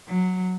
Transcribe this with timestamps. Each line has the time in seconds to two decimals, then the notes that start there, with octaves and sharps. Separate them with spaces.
0.08 F#3